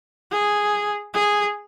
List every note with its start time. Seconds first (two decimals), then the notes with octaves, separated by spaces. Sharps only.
0.32 G#4
1.14 G#4